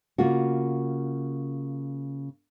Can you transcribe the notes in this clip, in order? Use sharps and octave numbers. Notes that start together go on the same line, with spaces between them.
C#3 A#3 F4 F#4